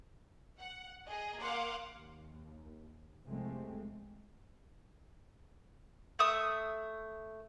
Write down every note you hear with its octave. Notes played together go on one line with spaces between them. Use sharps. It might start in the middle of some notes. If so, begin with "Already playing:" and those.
F#5
G#4 D#5
A#3 F5 F#5 C6 D6
D#2
C2 F2 C3 G#3 A3 C4
A3 E5 D#6